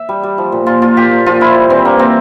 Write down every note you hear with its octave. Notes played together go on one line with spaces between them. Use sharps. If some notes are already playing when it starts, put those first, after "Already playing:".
Already playing: E5
G3
G3
F3
A#2
A#2 F4
F3 F4
A#2 G4
A#2
F3 F4
F3 E4
G3
E3 C4
G2 A#3
C4